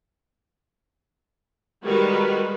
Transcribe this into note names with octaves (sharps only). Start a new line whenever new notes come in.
D#3 G3 G#3 F#4 A#4 B4